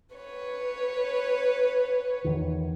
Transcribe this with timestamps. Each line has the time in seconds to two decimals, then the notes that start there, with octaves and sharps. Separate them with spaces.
0.15 B4 C#5
2.24 E2 D#3